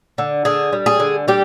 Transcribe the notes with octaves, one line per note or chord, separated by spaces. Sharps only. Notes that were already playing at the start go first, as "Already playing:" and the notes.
D3
D3 G#4
G3
G#4
D3
G3 G4